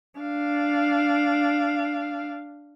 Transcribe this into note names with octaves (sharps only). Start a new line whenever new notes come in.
D4 F5